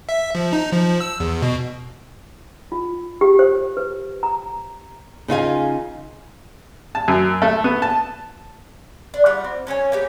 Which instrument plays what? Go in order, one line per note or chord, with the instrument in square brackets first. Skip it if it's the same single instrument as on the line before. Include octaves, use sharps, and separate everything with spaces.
[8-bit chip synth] E5
F3
D#4
F3
E6
E2
B2
[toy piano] F4
G4
C5
B4
A#5
[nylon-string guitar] C#3 D#4 F4 G#5
[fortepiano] A5
F#2
A3
B3
A5
[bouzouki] D4
G3 F4 F#5
C4
F#3 C#4 C#5 G#5
A#3 B3 G4